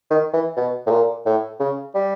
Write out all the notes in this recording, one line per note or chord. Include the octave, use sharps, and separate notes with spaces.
D#3
E3
B2
A2
A#2
A2
C#3
G3